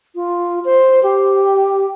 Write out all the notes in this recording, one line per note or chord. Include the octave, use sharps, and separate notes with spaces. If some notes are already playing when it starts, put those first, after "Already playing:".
F4
C5
G4